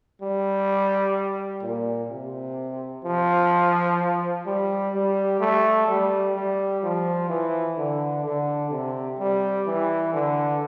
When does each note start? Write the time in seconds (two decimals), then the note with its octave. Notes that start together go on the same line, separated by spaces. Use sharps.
0.22 G3
1.62 A#2
2.10 C3
3.05 F3
4.46 G3
4.94 G3
5.40 A3
5.88 G3
6.36 G3
6.83 F3
7.29 E3
7.78 D3
8.25 D3
8.71 C3
9.19 G3
9.67 E3
10.13 D3